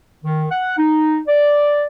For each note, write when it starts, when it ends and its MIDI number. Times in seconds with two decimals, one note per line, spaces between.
0.23 0.45 51
0.50 0.77 78
0.78 1.20 63
1.28 1.85 74